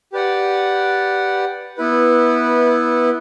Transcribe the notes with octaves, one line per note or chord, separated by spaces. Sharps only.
G4 B4 D5 F#5
B3 E4 B4